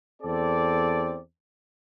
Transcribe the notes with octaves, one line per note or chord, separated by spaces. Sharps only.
E2 C4 A4 D5